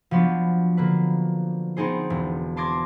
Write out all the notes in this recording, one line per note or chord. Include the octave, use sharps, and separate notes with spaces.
F3 F#3 B3 D4
D3 A#3 B4
B3 C4 D#4 G#4 C5
E1
A5 C6 D6 G#6 A#6